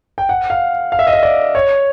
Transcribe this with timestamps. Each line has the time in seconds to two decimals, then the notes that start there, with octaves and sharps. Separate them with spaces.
0.18 G5
0.29 F#5
0.50 F5
0.92 F5
0.99 E5
1.07 D#5
1.13 E5
1.23 D5
1.55 C#5